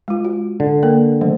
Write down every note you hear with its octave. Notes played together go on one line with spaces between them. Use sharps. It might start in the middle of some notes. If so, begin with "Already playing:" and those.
G#3 F4
F#4
D3
A#3 A#4
D#3 F#3 A3